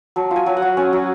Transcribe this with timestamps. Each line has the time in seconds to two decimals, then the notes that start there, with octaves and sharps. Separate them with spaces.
0.16 F#3 A5
0.31 F4
0.36 G#5
0.46 F#3
0.57 F#5
0.62 F#3
0.77 C#4 G#5
0.93 F#3